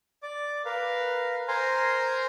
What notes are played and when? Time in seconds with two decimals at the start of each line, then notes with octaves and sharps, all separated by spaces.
0.23 D5 D6
0.65 A#4 B4 F5
1.48 A#4 C5 G#5 A#5 C6